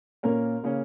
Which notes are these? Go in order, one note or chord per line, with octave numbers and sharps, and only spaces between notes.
A#2 A#3 C#4 A#4
C#3 A#3 C#4